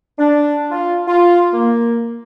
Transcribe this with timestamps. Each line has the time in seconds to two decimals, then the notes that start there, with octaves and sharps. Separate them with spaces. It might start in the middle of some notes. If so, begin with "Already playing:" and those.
0.19 D4
0.71 F4
1.07 F4
1.53 A#3